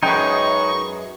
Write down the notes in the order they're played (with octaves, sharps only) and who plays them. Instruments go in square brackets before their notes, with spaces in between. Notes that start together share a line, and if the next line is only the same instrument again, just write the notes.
[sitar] F#2 G#3 B4 [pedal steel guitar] D#4 G5 [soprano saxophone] C#6